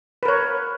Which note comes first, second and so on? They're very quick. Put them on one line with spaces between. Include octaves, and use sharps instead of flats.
B4 A#4 C#5